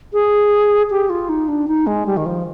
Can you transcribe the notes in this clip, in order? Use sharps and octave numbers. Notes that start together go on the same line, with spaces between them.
G#4
G4
F4
D#4
D4
D#4
G#3
G3
D#3
F3